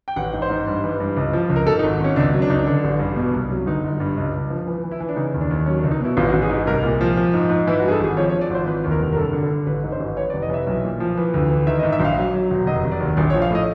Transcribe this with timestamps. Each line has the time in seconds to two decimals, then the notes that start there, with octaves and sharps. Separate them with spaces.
0.08 G5
0.16 A1 F#5
0.33 G#2
0.42 C5
0.50 G#2
0.67 G2
0.84 E3
1.00 G2
1.17 C#2
1.33 F3
1.50 C#2
1.56 A#4
1.67 G#2 A4
1.79 D#4
1.84 G#1
2.00 G#1 C#4
2.16 C#2 D4
2.34 F#3
2.42 D4
2.49 C#2 D#4
2.59 D4
2.66 D3
2.84 A1
2.99 G2
3.16 B2
3.33 C2
3.50 F#3
3.66 G1 D#4
3.84 G1
4.00 G2
4.17 C#2
4.34 C#2
4.50 F3
4.67 E3
4.84 E3
4.91 E4
5.00 E3
5.09 D4
5.16 C#3 D#4
5.34 D#2
5.41 D4
5.51 D#2
5.66 F#3 C#4
5.79 D4
5.83 C#2
5.91 D#4
6.00 B2 E4
6.17 A1 F4
6.29 F#4
6.33 A1
6.42 G#4
6.49 G#2
6.67 C2 A#4
6.83 A#2
7.01 F3
7.17 F3
7.33 G#2
7.50 G#2
7.67 E3 E4
7.80 F#4
7.84 G2 G#4
7.92 A4
8.00 G#1 G#4
8.17 F3 C#5
8.30 C#5
8.34 F3
8.41 D5
8.50 G#1 C5
8.67 E3 B4
8.84 D#2
8.91 A#4
9.00 F1
9.13 A#4
9.17 G2 A4
9.33 D3
9.42 A4
9.50 D3
9.66 A1 B4
9.83 G#2
9.92 C5
10.00 A1
10.17 E3 C#5
10.30 D5
10.34 F1
10.42 D#5
10.50 E3 E5
10.67 B1
10.83 A#2
11.00 F3
11.17 E3
11.34 D2
11.50 E3
11.67 D#3 E5
11.79 D#5
11.83 G#2
11.92 E5
12.00 A#1 F5
12.17 F#3
12.34 F#3
12.50 E1
12.66 F1 D#5
12.84 F1
12.92 D5
13.00 D#2
13.17 A#1 D5
13.30 C#5
13.33 F3
13.42 F5
13.51 A2 D#5